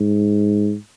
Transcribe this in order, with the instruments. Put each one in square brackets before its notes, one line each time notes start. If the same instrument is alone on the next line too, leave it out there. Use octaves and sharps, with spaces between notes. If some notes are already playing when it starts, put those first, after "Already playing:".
Already playing: [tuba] G#2